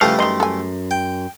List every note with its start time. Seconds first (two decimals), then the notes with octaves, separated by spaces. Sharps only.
0.01 C#3 E3 F3 G3 A3 F5 A5
0.19 F#2 D#3 D#5 C6
0.40 A4 G#5
0.91 G5